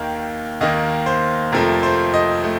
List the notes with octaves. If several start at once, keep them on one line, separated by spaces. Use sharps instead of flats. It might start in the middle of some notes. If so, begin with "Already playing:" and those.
Already playing: D#2 D#3 A#3 G5
D#2 D#3 A#3 D#5
C5
F2 C3 F3 A3 A#4
C5
D#5
A3